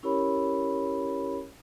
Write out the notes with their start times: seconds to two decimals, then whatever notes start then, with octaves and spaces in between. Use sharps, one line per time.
0.03 C#4 E4 G4 A#4 C#5 B5